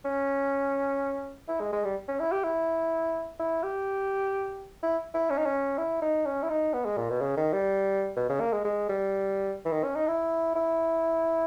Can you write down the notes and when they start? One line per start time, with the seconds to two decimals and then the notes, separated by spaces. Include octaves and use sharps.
0.05 C#4
1.48 E4
1.60 G#3
1.72 G#3
1.84 G3
2.08 C#4
2.20 E4
2.32 G4
2.44 E4
3.39 E4
3.63 G4
4.83 E4
5.14 E4
5.30 C#4
5.38 D#4
5.45 C#4
5.78 E4
6.02 D#4
6.26 C#4
6.43 E4
6.49 D#4
6.74 B3
6.85 G#3
6.97 A#2
7.10 B2
7.21 C#3
7.37 D#3
7.53 G3
8.16 B2
8.29 C#3
8.40 A#3
8.53 G#3
8.65 G#3
8.89 G3
9.65 E3
9.72 D#3
9.84 C#4
9.96 D#4
10.08 E4
10.55 E4